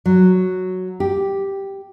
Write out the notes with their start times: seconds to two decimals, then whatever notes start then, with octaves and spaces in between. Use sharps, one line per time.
0.06 F#3
1.00 G4